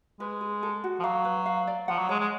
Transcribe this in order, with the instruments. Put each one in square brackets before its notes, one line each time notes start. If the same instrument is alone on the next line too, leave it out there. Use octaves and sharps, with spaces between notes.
[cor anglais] G#3 [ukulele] B4
[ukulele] G#4
A4
F#4
[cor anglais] F3
[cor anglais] F#3 [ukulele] F5
[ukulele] B4
F5
D5
[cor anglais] F3 [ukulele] F#5
[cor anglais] F#3
[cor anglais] G#3 [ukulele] C#5
[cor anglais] G#3